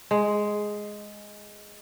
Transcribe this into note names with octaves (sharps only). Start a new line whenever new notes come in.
G#3